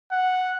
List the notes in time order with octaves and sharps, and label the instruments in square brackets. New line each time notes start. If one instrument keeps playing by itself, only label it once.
[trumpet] F#5